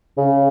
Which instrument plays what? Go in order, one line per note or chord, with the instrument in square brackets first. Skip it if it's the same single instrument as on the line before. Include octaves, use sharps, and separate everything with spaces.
[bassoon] C#3